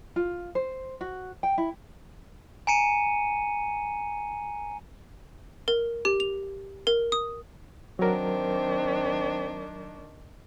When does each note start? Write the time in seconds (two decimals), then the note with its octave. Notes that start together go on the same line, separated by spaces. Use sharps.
0.16 F4
0.55 C5
1.01 F#4
1.43 G5
1.58 E4
2.67 G#5 A#5 C#7 D#7
5.68 A#4
6.05 G4
6.20 F7
6.87 A#4
7.12 D#6
7.99 D#3 F#3 C4 D4 A#4